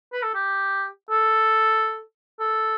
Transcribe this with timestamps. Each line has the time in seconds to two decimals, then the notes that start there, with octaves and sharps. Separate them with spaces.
0.13 B4
0.23 A4
0.34 G4
1.10 A4
2.40 A4